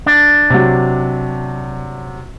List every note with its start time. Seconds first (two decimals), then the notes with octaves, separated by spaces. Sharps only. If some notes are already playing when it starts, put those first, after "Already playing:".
0.06 D4
0.50 C3 F#3